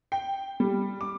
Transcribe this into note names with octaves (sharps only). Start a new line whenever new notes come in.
G5
G3
D6